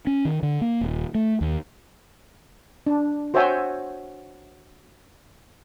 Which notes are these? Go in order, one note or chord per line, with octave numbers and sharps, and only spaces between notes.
C#4
D#3
D3
A#3
D#1
A3
D#2
D4
F#4 C5 C#5 E5 G5 G#5